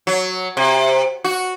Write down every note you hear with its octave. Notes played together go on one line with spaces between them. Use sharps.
F#3
C3
F#4